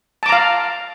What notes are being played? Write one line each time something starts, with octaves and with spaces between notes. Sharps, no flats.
F5 A5 A#5 D6